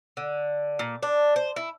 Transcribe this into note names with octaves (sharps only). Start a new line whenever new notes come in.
D3
A#2
D4
C5
E4